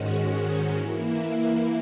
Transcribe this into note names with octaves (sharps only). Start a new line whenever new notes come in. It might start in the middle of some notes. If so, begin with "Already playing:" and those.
Already playing: G#2 D#3 G#3 C#4 F#4
E3 A#3 E4